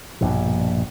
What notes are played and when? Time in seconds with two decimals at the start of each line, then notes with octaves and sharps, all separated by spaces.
0.21 A#1 G2 B2